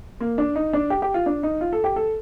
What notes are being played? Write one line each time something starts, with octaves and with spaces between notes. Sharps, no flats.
A#3
D4
D#4
D4
G4
G4
F4
D4
D#4
F4
A4
G4
A4